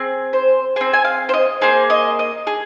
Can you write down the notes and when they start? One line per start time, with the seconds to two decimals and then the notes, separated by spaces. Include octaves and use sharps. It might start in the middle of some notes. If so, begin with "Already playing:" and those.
Already playing: C4 G#4
0.33 C5
0.76 C4 G#4 C5
0.94 G#5
1.05 F5
1.29 C5
1.33 D#5
1.61 A#3 G#4 C5
1.90 D#5
2.19 D#5
2.47 G#4